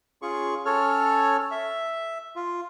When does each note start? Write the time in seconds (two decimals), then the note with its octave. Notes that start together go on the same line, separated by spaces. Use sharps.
0.22 C#4 F4 G#4 C#6
0.65 C#4 A4 C#5 F6
1.51 E5
2.36 F4